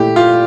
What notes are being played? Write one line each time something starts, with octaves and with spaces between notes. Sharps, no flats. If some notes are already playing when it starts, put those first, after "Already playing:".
Already playing: A#2 A3 E4 G4
F4